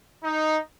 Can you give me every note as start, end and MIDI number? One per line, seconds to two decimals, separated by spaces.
0.24 0.58 63